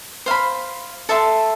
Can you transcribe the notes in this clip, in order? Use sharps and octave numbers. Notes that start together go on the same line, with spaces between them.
C5 F5 B5
A4 E5 A5 C6